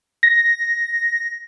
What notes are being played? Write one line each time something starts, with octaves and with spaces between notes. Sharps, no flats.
A#6